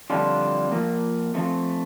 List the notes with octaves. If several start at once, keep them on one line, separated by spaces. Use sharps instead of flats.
F2 D3 G3 D4 F4
F3 A#3 F4
F3 A3 C4 F4